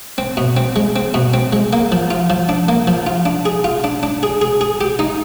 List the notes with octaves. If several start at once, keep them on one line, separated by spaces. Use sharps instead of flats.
C4
B2
C4
G#3
C4
B2
C4
G#3
A#3
F3
F4
F3
D4
A#3
F3
F4
D4
G#4
F4
D4
D4
G#4
G#4
G#4
G4
D#4